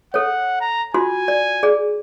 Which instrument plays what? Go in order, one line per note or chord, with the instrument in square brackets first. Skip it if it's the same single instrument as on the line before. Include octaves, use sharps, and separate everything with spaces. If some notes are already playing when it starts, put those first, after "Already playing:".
[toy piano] A4 C#5 [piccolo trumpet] F#5
[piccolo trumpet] A#5
[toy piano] F4 F#4 C6 [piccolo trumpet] G#5
[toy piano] D5
G#4 D5